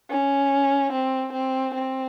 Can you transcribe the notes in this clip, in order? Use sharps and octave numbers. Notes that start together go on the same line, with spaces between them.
C#4
C4
C4
C4